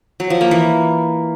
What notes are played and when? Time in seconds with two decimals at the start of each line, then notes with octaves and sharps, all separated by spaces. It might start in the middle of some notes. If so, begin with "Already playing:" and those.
0.20 F#3
0.30 F3
0.41 A#3
0.51 E3